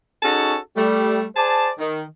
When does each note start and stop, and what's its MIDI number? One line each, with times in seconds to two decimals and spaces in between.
0.22 0.56 61
0.22 0.56 63
0.22 0.56 66
0.22 0.56 68
0.22 0.56 69
0.22 0.56 81
0.76 1.24 55
0.76 1.24 57
1.37 1.70 68
1.37 1.70 72
1.37 1.70 74
1.37 1.70 81
1.79 2.02 51